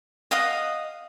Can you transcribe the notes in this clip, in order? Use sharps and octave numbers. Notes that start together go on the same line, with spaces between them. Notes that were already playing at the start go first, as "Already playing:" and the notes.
D#5 F5 F#5 D#6